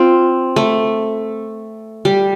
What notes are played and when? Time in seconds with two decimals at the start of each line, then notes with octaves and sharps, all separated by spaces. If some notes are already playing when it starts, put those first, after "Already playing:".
Already playing: C4 F4
0.56 A3
2.05 G3